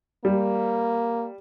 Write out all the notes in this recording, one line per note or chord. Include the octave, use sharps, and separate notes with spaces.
G3 A#3